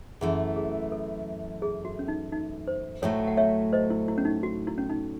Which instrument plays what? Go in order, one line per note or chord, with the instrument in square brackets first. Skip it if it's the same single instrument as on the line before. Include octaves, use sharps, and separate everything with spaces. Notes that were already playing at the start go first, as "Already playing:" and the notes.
[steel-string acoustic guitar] F#2 E3 A3 [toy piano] G#4
[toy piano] G#4
A4
G#4
F#4
C#4
D#4
D#4
C5
[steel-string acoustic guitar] A2 F#3 A3 [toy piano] A4 C#5
[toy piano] F#5
C#5 E5
C5 D#5
E4
E4
C#4
D#4
F#4
E4
C#4
D#4